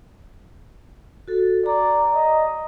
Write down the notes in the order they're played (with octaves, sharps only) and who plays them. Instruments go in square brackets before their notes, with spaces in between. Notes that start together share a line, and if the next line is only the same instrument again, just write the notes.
[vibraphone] F#4 A4
[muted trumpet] D5 [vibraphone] A#5
[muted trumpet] D#5